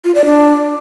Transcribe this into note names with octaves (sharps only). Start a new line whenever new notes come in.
F4
D5
D4